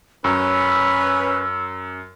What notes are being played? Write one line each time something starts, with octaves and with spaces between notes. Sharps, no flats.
F#2 C#4 B4 E6